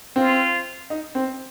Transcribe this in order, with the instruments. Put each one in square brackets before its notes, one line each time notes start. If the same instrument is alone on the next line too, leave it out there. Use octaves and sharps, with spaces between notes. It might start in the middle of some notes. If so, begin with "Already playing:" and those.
[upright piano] C4 [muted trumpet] F4
[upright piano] D#4
C4